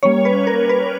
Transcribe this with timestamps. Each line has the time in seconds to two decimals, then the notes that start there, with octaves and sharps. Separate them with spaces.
0.03 G3 A#3 C#4 C#5
0.25 B4
0.47 A#4
0.69 B4